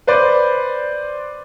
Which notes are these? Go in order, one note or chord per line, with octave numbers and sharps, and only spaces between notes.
B4 C5 D5